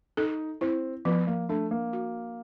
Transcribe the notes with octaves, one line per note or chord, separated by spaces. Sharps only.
D#4 A4
C4 E4
F3 B3
A#3
A3 D4
A#3
F#4